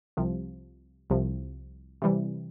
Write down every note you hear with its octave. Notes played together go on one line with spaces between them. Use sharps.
C2 C3 F3
C2 C3 F3
C3 E3 G3